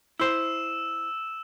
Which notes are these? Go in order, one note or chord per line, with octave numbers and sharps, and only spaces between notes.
E4 C5 E6 E7